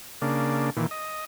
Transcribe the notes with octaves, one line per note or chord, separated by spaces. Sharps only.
C#3 A#3 D4
A#2 D#3 E3
D#5